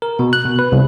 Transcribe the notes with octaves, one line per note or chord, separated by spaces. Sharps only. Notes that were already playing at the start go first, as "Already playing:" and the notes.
A#4
B2
F#6
B2
B4
C2